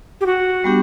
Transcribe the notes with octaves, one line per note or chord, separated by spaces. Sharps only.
G4
F#4
G3 B3 D4 G4